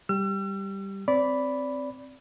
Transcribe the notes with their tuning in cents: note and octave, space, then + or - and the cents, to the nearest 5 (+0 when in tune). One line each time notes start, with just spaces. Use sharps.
G3 +0 G4 +0 E6 +45
C4 +0 D5 -20 B5 +0